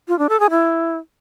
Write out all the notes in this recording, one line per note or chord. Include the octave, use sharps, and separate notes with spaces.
F4
D4
A4
G#4
E4